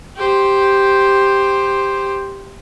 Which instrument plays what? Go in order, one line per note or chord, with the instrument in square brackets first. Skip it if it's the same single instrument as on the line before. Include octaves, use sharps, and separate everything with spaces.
[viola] G4 C5